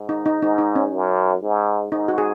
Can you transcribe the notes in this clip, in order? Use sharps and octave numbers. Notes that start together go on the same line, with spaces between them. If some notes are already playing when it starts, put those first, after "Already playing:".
Already playing: G#2
D#4
D#4
G#2 D#4
D#4
C#4
F#2
G#2
G#2 D#4
F#4
G#4